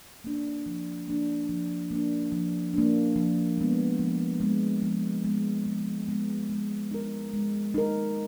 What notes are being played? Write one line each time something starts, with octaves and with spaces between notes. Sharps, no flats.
A#3 D4
F3
A#3 D4
F3
A#3 D4
F3
A#3 D4
F3
G#3 B3
F3
G#3 B3
F3
G#3 B3
F3
G#3 B3
G#3
D#4 A#4
G#3
D#4 A#4